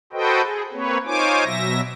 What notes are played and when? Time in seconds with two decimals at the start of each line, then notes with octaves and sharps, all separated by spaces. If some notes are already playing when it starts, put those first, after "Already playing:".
0.13 F#4 A4 B4 C5 D#5 G5
0.43 G#4
0.72 A#3 C4 B4 C#5
1.06 D#4 F4 C5 C#5 G#5 D6
1.44 B2 F#3 E5 A#6